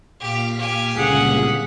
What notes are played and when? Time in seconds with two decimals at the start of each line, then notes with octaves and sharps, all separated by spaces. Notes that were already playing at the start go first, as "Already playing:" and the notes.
0.20 A#2 G4 F5 B6
0.59 G4 G#5
0.96 G1 C#2 G#4 F#5